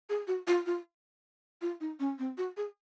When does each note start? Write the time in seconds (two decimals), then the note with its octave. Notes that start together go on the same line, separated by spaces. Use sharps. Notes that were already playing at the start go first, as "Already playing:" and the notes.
0.09 G#4
0.27 F#4
0.47 F4
0.66 F4
1.62 F4
1.80 D#4
2.00 C#4
2.19 C4
2.38 F#4
2.57 G#4